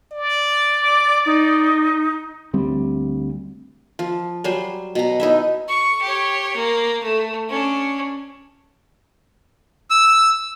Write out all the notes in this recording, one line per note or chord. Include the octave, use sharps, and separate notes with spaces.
D5
D6
D#4
D2 G3 C4
F3
F#3 G3 C5 G#5
B2 A#5
D#4 E4 E5
C#6
G4 C#5
A#3
A3
C#4 D4
E6